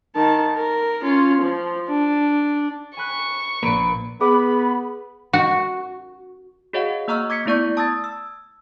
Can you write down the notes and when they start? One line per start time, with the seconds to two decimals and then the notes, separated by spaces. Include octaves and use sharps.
0.16 D#3 A5
0.57 A#4
1.03 C#4 F4
1.41 F3
1.89 D4
2.97 G#5 B5 C#6 F#6
3.63 A#1 A#2 A#3 B4 D7
4.21 B3 G#4 B5
5.33 F#4
6.73 F#4 G#4 C#5 D#5 F5 F#5
7.08 A#3 D#5 A#5 C#6 E6 F6
7.30 D6 G#6 B6 C#7
7.46 A3 B3 E4 D5 C#6 G6
7.77 A5 D#6 E6 G#6 A6
8.04 E6